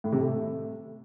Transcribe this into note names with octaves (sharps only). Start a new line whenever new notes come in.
A2
C3
A3